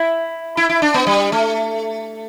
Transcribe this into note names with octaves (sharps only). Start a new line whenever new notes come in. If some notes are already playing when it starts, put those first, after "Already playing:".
Already playing: E4
E4
E4
D4
B3
G3
A3